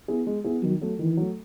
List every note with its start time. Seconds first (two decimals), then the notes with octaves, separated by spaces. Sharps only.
0.08 B3 E4 G#4
0.27 G#3
0.44 B3 E4 G#4
0.63 D#3 F#3
0.81 F#3 A3
0.99 D#3 E3
1.17 F#3 A3